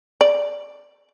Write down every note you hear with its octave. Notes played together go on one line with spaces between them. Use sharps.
D5